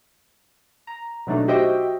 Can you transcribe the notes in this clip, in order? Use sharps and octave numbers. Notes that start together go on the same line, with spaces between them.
A#5
B2 F#3 A3 D4 D#4
F#4 G4 C5 D#5 E5 G5